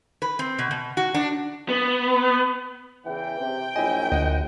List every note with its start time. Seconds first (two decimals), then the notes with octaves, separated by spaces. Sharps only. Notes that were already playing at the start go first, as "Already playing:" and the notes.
0.22 B4
0.39 C4
0.58 B2
0.71 B2
0.97 F#4
1.14 D4
1.69 B3
3.06 E2 C#3 E3 G5
3.40 C3
3.76 A#1 F#2 E4 D#5 G#5
4.12 D2 D#5 F#5